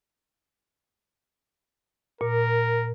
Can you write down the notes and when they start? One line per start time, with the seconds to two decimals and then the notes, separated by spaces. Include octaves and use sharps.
2.21 A#2 A#4